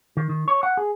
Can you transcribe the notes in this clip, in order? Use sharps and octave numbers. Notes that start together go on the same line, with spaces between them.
D#3
D#3
C#5
F#5
G#4